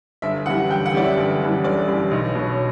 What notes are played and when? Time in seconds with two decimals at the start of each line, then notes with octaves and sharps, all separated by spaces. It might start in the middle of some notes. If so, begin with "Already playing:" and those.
0.22 G1 E5
0.46 F#2 E3 G3 F#5
0.69 G1 G5
0.86 F#5
0.94 F#2 E3 G3 D5
1.02 E5
1.17 G1
1.40 F#2 E3 G3
1.64 G1 D5
1.87 F#2 E3 G3
2.11 B1
2.35 B2 F#3